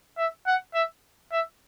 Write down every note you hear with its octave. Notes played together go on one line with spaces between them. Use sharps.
E5
F#5
E5
E5